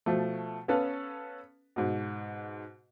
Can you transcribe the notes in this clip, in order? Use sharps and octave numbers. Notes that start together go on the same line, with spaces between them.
B2 F3 A3
B3 C#4 A4 B4 F5
G#2 B2